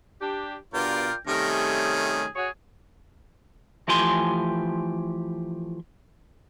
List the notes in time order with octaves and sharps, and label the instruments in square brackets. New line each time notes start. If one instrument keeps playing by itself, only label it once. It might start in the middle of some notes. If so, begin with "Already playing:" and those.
[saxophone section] D4 G4
[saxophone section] G2 B2 [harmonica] F4 A#4 D5 [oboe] G5
[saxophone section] C3 G3 A3 [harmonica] D#3 C#4 [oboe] A#4
[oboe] G#4
[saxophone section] F#4 C#5 [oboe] G#4
[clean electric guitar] E3 F3 A3 G4 G#5 C6